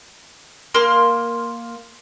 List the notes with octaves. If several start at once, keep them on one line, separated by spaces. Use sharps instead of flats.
A#3 C6 F6